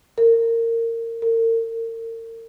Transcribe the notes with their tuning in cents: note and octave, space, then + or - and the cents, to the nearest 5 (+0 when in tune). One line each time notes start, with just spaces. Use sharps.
A#4 -25
A#4 -40